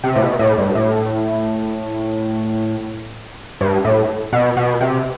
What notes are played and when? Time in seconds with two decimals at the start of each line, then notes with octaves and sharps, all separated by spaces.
0.04 C3
0.15 A2
0.22 B2
0.39 A2
0.58 G2
0.75 A2
3.61 G2
3.85 A2
4.33 B2
4.57 B2
4.81 C3